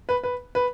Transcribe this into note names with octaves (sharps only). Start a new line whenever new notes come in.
B4
B4
B4